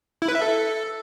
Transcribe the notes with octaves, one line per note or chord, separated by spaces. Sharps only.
E4
B4
E5
A4